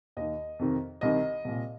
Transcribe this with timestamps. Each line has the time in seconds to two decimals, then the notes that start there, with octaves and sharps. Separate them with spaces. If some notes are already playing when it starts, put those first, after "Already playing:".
0.17 D#2 D#3 D#5
0.59 F2 C3 D#3
1.01 C2 C3 D#3 D#5
1.45 C2 A#2